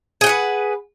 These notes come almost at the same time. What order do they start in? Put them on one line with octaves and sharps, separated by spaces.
G#4 G5 F#5 B4